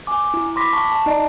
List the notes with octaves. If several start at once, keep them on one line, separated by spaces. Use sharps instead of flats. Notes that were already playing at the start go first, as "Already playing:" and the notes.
G#5 D6
E4
B5 C6 D6 A#6 B6
A5 C#6
A5
D#4 D5 D#5 A#5